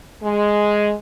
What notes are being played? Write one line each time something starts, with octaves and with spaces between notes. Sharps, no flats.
G#3